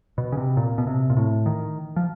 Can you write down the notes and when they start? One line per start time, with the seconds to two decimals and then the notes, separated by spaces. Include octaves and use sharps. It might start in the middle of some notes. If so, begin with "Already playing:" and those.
0.18 B2
0.32 C#3
0.37 C3
0.57 A#2
0.78 B2
0.87 C3
1.10 A#2
1.17 A2
1.46 D#3
1.96 F3